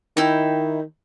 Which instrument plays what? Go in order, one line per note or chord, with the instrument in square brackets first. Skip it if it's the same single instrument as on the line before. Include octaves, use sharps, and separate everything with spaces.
[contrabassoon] D#3 [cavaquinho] D#4 E4 G5